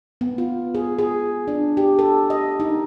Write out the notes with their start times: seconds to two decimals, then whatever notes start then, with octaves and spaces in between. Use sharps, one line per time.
0.21 B3
0.38 F4
0.75 G#4
0.99 G#4
1.48 D4
1.77 G4
1.99 A4
2.30 D#5
2.60 D#4